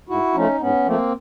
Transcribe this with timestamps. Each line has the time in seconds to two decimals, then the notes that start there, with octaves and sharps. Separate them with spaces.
0.09 G#2 E4 F#4
0.34 F3 A3 C#4 D#4
0.60 G#2 B3 C#4
0.85 F3 A3 A#3 C4